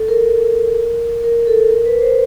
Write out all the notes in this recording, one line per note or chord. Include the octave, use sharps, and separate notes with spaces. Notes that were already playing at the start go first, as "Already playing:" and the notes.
Already playing: A4
A#4
A#4
A4
A#4
B4
C5